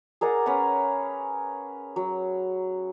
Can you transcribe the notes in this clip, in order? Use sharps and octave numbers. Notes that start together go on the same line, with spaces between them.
G#4 A#4 D5 F#5
C#4 A#4 B4 F#5
F#3